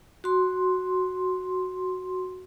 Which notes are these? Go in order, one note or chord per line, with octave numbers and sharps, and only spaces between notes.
F#4 C6